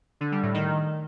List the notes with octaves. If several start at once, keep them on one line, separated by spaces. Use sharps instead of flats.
D3
G3
A2
D#3